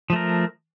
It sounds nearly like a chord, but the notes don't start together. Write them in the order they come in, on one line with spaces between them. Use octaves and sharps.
F3 A3 A#4